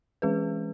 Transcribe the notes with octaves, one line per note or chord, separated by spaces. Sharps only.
E3 G#3 C#4 G#4 B4